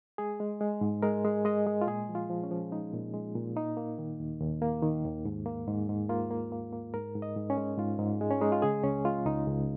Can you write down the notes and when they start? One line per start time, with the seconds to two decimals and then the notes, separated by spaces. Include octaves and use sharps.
0.18 G#3 G#4
0.40 G#3
0.61 G#3
0.81 G#2
1.02 G#3 A#4
1.24 G#3
1.45 G#3 D#5
1.66 G#3
1.81 F4
1.87 A#2 G#4
2.09 F3
2.15 F4
2.30 F3
2.44 C#4
2.51 F3
2.72 G#3 D#4
2.93 A#2
3.14 G#3
3.35 A#2
3.56 A#3 D#4
3.77 A#3
3.98 D#3
4.20 D#2
4.40 D#2
4.62 A#3
4.82 D#3
5.04 D#2
5.25 G#2
5.46 A#3
5.67 G#2
5.89 G#2
6.09 A#3 F4
6.31 A#3
6.52 A#3
6.72 A#3
6.94 G#2 A#4
7.15 G#2
7.22 D#5
7.36 G#2
7.50 C#4
7.57 G#3
7.78 G#2 F4
7.99 G#2
8.21 G#3
8.31 C#4
8.41 G#3 D#4
8.52 F4
8.62 C#3 G#4
8.83 C#2 C#4
9.05 G#3 F4
9.26 C#2 D#4
9.47 C#2